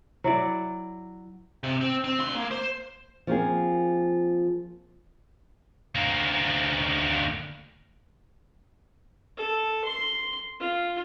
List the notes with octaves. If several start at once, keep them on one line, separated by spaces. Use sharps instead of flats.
F#3 E4 D5
C3
C4
C4
D2 C6
A#3
C5
F3 A#3 C4 G#4
D2 A#3
A4
C6
F4